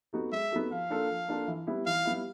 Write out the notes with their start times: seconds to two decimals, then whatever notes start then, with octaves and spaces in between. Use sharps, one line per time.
0.13 B3 D#4 F#4 A4
0.32 G#3 E5
0.51 B3 D#4 F#4 A4
0.71 F3 F5
0.90 A#3 D4 F4 A4
1.10 F3
1.28 A#3 D4 F4 A4
1.48 E3
1.67 G3 B3 E4
1.86 E3 F5
2.05 G3 B3 E4